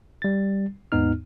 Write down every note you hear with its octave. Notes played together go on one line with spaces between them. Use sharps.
G3 A6
D#2 G#2 B3 D#4 F6